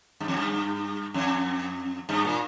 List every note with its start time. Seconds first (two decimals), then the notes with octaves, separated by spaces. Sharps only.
0.20 G2
0.28 F2
0.37 G2
1.14 F2
2.09 G2
2.25 A#2